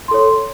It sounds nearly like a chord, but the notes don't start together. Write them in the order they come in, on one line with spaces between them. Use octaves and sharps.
C6 A4 C#5